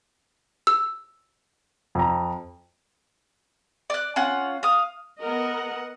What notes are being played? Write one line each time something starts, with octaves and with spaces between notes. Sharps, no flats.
E6
F2 A#5
D5 F#6
C#4 F4 F#5 F#6
F5 D#6
B3 A#4 D#5 F#5